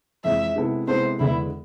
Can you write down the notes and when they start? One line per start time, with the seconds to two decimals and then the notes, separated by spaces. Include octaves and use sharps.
0.24 F2 E3 G#3 E5
0.56 C3 G#3 B3 E4 A4
0.87 C3 G#3 B3 E4 A4 C5
1.20 E2 D3 G#3 B3 E4